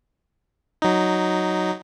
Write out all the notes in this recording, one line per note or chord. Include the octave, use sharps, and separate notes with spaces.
F#3 D#4